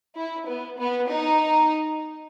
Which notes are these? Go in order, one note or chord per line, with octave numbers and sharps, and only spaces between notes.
E4
B3
B3
D#4